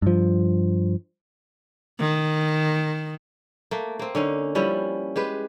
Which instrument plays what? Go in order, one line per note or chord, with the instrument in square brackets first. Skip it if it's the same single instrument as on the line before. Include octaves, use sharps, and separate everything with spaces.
[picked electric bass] G2 F3
[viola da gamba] D#3
[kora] A3 A#3
A#3 C4
D3 C#4 D#4
F3 G3 C#4 E4
G#3 G4 B4